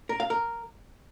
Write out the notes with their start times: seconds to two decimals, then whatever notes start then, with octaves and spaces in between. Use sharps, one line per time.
0.09 A#4
0.20 F5
0.30 A#4